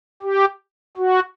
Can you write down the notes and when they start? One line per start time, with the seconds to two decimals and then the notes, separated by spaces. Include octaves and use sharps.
0.22 G4
0.97 F#4